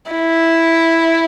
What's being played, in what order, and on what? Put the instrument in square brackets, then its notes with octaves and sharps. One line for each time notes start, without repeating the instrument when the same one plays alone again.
[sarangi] E4